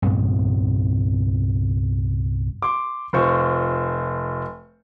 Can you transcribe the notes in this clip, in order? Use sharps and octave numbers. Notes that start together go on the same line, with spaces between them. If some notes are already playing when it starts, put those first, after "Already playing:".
C2 G2 A#2 B3
C6 D6
F1 F4 C5 C#6